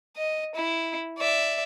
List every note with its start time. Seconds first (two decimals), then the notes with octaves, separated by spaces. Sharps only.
0.17 D#5
0.55 E4
1.18 D5 E5